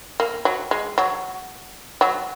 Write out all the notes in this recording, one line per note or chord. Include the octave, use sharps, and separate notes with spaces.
A#3
F#3
G#3
F#3
F#3